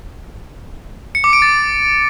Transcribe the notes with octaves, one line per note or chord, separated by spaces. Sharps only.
C#7
D6
D7
A6